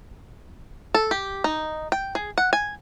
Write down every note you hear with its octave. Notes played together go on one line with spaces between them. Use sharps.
A4
G4
D#4
G5
G#4
F#5
G#5